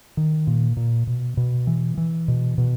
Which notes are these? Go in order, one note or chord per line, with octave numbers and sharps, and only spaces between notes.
D#3
A#2
A#2
B2
B2
E3
E3
B2
B2